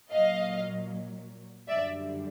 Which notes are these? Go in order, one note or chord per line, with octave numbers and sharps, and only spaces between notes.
A#2 F#3 D#5 F5
F#2 D3 G3 D5 E5